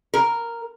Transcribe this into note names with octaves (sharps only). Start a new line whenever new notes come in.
A#4